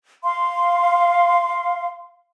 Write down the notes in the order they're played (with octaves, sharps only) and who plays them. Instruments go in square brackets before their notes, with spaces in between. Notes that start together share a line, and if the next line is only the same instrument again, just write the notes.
[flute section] F5 C6